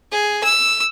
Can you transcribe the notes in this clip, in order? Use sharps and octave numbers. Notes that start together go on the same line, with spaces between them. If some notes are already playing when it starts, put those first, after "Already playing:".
G#4
E6